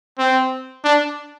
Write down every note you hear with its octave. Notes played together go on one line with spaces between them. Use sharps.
C4
D4